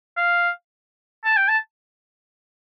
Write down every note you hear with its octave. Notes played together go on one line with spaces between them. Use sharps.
F5
A5
G5
A5